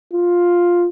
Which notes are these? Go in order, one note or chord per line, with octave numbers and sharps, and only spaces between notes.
F4